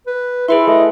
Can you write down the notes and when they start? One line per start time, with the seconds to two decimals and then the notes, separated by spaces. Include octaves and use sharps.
0.07 B4
0.48 E4 G#4 B4 E5 C6
0.67 A3 D#5